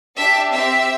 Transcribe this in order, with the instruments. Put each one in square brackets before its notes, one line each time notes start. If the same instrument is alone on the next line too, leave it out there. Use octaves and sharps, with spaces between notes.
[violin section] D4 G4 E5
C4 G4 E5